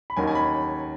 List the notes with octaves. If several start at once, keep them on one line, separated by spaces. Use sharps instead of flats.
B5
D#2 D#3 F#3 C#4 G#5
G#5
B5